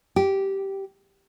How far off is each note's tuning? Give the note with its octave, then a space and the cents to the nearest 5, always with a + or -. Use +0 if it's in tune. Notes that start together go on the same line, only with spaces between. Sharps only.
G4 -10